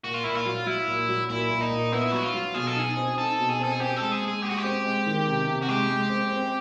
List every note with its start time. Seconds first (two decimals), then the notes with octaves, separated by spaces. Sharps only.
0.04 A#2 F#4
0.14 F4
0.24 A#2 E4
0.35 F4
0.46 F#3
0.66 F#3 E4
0.88 A#2
1.09 F#3
1.30 A#2 E4
1.51 A#2
1.61 D#4
1.71 A#2
1.92 B3 E4
2.12 F#3 F#4
2.23 F4
2.34 F#3
2.54 B2 G#4
2.67 A4
2.76 D#4 G#4
2.97 C4
3.18 D#4 A4
3.39 B2
3.49 G#4
3.60 C4 A4
3.72 G#4
3.80 C4 G4
3.96 G#3 A4
4.12 G#4
4.22 G#3
4.28 G#4
4.43 G#3 G4
4.50 F#4
4.58 G4
4.64 C4
4.85 G#3
5.06 D#3
5.26 C3
5.47 C3
5.63 F#4
5.68 G#3 G4
5.89 G#3
6.10 C4
6.31 C4